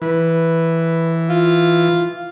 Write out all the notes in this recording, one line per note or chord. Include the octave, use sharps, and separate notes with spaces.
E3 B4
F4